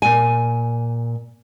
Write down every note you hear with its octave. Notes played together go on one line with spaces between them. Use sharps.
A#2 G#5